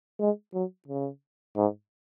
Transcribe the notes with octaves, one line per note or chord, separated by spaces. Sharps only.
G#3
F#3
C#3
G#2